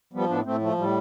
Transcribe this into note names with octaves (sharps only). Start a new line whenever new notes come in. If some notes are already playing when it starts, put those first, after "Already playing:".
F3 G3 B3
A2 B3 D4
A2 A3 C4
F3 A3
A2 G3